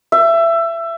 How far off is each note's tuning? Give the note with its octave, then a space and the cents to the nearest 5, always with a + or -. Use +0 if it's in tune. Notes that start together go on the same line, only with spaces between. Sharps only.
E5 +20